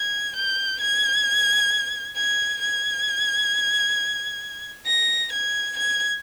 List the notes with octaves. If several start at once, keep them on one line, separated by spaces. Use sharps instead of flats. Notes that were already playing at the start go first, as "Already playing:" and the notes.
Already playing: G#6
G6
G#6
G#6
G#6
A#6
G#6
G#6